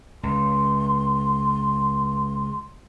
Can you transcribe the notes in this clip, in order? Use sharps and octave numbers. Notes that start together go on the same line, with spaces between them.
C#2 C6